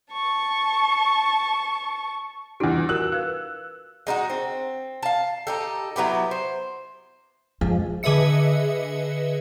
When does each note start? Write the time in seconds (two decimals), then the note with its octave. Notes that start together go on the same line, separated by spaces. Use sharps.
0.12 A5 C#6
2.60 E2 G3 D4 E4 F4
2.89 F#4 A#4 E6 F#6
3.12 A#4 B4 F5
4.07 G#3 D#4 E4 F#4
4.30 C4
5.03 F5 A5
5.47 D#4 G4 A4
5.96 F#3 B3 E4 G4
6.31 C5
7.61 F2 F3 G#3
8.03 D3 G#4 B4 D#5 E5 C#7